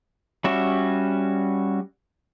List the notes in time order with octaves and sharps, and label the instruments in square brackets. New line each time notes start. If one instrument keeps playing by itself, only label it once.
[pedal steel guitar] G3 C#4 F#4 E5